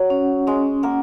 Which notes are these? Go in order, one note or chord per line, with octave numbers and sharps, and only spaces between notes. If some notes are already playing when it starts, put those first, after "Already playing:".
Already playing: F#3 F#5
C#4
G#3 C#4
A#3 F#5